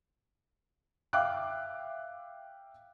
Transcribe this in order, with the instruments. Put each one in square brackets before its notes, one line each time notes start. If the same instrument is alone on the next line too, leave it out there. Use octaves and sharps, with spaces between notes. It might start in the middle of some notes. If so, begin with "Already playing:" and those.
[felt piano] E5 F5 G5 D6 F#6